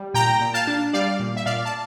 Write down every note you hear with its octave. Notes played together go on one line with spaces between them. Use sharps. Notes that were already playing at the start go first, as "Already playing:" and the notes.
Already playing: G3
A#2 G5 A#5
A#2
F5 A5
D4
G3 D5 F5
A#2
E5
A#2 D5 F5
A5